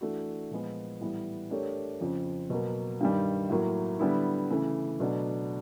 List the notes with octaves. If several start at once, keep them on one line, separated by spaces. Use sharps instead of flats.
E3 A3 D4 F#4
A#2 F3 G#3 B3
A2 E3 G3 B3
A3 D4 G4 A#4 C#5
F2 C#3 F3
B2 F#3 A#3
G2 D#3 G3
A2 F#3 A#3
D3 G3 B3 E4
C#3 E3 A3
B2 F#3 A3 D4